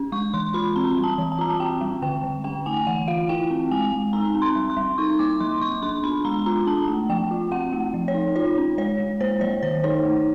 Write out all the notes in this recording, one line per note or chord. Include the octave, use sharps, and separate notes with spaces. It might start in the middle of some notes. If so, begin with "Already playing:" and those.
Already playing: C#4
G#3 C#6
E3 C6
F4 B5
C4 A#5
G3
A5
E3
A5
F4 A#5
A5
C4 G5
G3
D3 G5
D3
C#4 G5
A3 G#5
E3 F#5
F4 F5
E4 G5
C4
G#3 G#5
G#3
D#4 A#5
C4
C6
G3
C6
G3
D#4 C#6
A#3 D6
F#3 C6
F#3 C#6
D4 C6
B3 B5
G#3 A#5
F4 A#5
D4 A5
A3
F3 G5
F4
C4 F#5
A3
F3
C#5
D#4
F4 C#5
C#4
G#3 C#5
G#3
A#3 C5
F#3 C#5
D#3 C5
D#4 C#5
A3